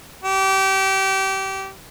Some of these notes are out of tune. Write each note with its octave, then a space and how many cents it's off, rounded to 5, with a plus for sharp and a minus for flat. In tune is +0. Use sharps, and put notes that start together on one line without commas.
G4 -25